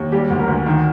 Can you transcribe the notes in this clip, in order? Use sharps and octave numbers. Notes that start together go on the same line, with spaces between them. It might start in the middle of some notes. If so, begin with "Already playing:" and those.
Already playing: D#2
G3 G4
D2
A#4
D2
D#3